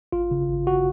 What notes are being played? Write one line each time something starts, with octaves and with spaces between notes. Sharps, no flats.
G#1 F4
C#3
G#1
F#4